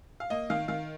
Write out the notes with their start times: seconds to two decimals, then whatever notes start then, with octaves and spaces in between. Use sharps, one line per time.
0.20 F5
0.30 A#3 D#5
0.50 D#3 F5
0.68 D#3 F5